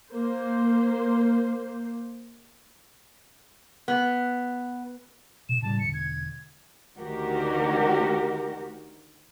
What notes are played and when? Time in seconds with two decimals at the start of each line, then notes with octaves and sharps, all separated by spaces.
0.14 A#3 C5
3.88 B3
5.49 B2 E7
5.62 A2 C#3 G3 A5
5.79 E1 D3 C#7
5.94 G#6
6.97 D2 D#3 F#4 G4 A#4